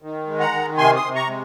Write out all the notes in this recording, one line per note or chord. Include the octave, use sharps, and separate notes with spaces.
D#3
G#3
F#5 A#5
D#3
C3 G#5 C6
C6 D#6
C3
A#5 C#6
G#3